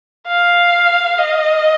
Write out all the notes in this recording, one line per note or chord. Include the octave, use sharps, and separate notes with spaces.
F5
D#5